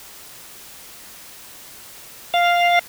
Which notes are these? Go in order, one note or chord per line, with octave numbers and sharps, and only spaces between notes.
F5